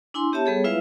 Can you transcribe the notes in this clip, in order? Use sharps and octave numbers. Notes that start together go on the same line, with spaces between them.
D4 E4 G#5 C6
B3 G4 C#5 E5 A5
G3 B3 G#4 A4 C#5
G#3 E4 F4 B4 E5 F5